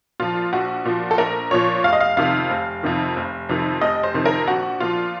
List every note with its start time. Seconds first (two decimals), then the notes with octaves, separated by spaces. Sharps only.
0.20 A#2 F3 F4
0.53 A#1 F#4
0.85 A#2 F3
1.11 A4
1.18 A#1 A#4
1.51 A#2 F3 C#5
1.84 F1 F5
1.93 D#5
2.00 F5
2.17 F2 C3 D#3 F5
2.50 F1
2.83 F2 C3 D#3
3.16 F1
3.49 F2 C3 D#3
3.81 F1 D#5
4.03 C5
4.14 F2 C3 D#3
4.26 A#4
4.47 A#1 F#4
4.80 A#2 F3 F4